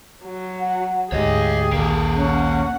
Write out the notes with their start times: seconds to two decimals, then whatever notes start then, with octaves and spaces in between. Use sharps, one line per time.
0.24 F#3
0.60 F#5
1.12 D2 G#2 G4 G#4 C#5 D#5
1.73 A#1 D#2 A#3 A4
2.14 C#4 F#5